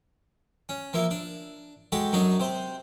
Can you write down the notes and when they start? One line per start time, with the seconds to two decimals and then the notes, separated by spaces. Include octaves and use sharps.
0.69 C#4
0.93 F3 A#3 E4
1.11 D4
1.92 G#3 F#4 G4 A4
2.12 F#2 F#3 D4 D#4 F#4
2.40 C3 C5